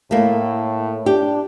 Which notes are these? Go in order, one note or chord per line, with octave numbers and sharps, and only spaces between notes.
A2 A3 A#3
D4 G4